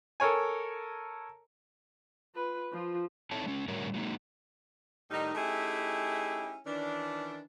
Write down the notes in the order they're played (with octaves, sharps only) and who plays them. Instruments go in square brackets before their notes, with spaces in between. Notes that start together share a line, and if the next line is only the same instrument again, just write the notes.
[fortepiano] A4 A#4 C#5 G#5
[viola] F4 B4
F3 F4
[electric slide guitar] C4 D#4 E4 A4 C#5 A5
G#3 C#4
A2 D3 G3 F#4 A#4 C#5
F#3 G#3 A#3 D#4
[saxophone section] A2 D#3 G3 D#4
A3 C#4 D#4 E4 G4 G#4
D#3 E3 C#4 D4